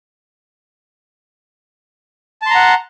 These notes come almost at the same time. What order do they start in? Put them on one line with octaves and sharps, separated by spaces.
A5 C6 A#5 F#5